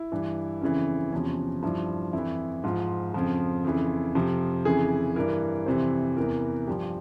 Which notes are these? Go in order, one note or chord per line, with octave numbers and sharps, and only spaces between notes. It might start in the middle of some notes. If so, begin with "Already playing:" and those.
Already playing: E4
G2 E3
F2 C#3 E3 C#4
E2 C3 F3 C#4
G2 F3 E4
F2 E3 E4
G#2 F3 F4
F2 C#3 F3
F2 C#3 E3
F2 C3 F3
F2 C#3 E3 G#4
G2 E3 A#4
F2 C3 E3 C5
E2 C3 E3 A#4
G2 F3 G4